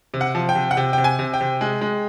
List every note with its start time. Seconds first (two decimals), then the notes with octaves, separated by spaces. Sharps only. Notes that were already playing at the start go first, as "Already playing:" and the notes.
0.14 C3
0.21 F#5
0.35 F3
0.49 G5
0.55 C3
0.71 F#5
0.77 C3 G5
0.93 C3 G5
1.04 G#5
1.19 C3
1.34 G5
1.41 C3
1.61 G#3
1.81 G#3